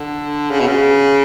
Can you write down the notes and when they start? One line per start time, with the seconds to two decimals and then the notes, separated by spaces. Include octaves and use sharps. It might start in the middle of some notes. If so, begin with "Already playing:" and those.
Already playing: D3
0.50 C#3
0.60 B2
0.67 C#3